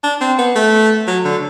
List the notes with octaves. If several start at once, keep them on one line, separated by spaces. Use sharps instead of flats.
D4
C4
B3
A3
F#3
D3